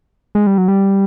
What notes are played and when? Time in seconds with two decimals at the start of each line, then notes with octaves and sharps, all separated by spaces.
0.35 G#3
0.47 G3
0.58 F#3
0.68 G3